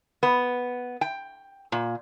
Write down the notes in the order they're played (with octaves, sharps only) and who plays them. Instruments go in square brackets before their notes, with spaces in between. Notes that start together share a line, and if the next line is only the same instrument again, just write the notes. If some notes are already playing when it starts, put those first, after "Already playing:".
[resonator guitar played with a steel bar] B3
G5
A#2